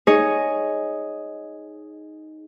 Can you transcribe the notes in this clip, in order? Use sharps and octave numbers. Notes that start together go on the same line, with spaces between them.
D#4 G#4 C#5 D#5